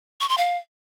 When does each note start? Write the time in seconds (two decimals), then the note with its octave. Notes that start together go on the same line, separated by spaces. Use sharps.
0.21 C#6
0.29 C6
0.38 F5